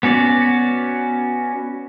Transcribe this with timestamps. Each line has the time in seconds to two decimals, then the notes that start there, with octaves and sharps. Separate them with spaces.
0.03 B3 C#4 F#4 D5